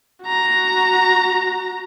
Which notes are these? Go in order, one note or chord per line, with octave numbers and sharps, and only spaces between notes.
F#4 A#5